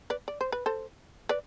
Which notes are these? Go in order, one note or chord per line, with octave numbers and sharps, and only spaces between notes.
B4 D5
D5
C5
B4
A4 C5
B4 D5